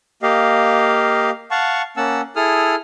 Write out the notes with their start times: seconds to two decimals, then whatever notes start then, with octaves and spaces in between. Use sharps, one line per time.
0.22 A#3 G4 D#5 F5
1.51 F5 F#5 A5 C#6
1.97 A#3 C#4 F#5 A5 E6
2.36 E4 G#4 A4 D#6 F6